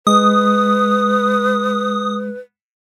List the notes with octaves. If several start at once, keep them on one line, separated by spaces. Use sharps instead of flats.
G#3 B4 D#6